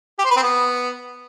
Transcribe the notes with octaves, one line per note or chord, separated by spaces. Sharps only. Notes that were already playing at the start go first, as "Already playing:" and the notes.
G4
C5
B4
C4
B3